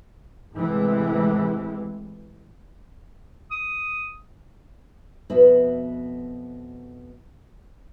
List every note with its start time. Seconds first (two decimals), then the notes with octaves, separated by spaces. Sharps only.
0.56 A2 C3 E3 G#3
3.51 D#6
5.30 F2 B2 B3 F#4 B4 E5